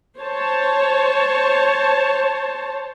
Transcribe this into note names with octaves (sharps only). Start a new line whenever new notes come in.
C5 C#5 A5